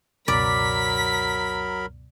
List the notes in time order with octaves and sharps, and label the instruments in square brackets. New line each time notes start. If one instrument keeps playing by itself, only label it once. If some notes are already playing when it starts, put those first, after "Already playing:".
[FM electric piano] C#2 F#2 B2 [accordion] F#3 A#4 B5 [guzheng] D5 [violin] B6